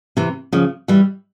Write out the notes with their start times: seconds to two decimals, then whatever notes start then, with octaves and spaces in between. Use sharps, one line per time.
0.17 C3 E3
0.53 C#3 F3
0.88 E3 G3